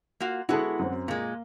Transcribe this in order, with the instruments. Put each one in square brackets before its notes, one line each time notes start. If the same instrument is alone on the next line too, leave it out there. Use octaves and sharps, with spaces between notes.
[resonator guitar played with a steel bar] A#3 F4 F#4
[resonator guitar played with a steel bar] G#3 B3 F#4 [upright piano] E4 G#4 A4
[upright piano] F#2 C4
[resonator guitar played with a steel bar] A#2 G#3 [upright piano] A#3